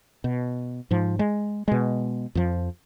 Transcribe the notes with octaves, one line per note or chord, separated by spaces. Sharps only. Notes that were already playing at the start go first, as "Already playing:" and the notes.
B2
G#2 F3
G#3
B2 G#3
F2 F3